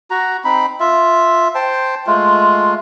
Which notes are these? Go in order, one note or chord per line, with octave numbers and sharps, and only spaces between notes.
F#4 A#5
C4 D#4 B5
F4 E5
C5 G5 A5
G#3 A3 F4